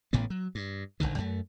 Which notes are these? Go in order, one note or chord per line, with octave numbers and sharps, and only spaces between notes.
A1 A2 C#3 B3
F#3
G2
F#1 D#2 D3 D#3
F#2 A3